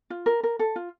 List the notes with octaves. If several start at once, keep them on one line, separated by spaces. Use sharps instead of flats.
F4
A#4
A#4
A4
F4